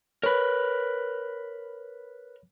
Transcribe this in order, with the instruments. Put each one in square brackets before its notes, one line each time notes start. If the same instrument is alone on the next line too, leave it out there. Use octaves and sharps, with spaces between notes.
[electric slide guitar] A#4 B4 [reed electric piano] C#5 B5